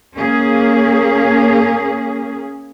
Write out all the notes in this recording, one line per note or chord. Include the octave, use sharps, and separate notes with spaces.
A#3 C#4 G#4